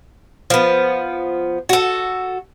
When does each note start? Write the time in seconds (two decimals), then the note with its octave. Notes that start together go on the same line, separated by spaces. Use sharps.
0.50 F3 B3
1.69 F#4 A4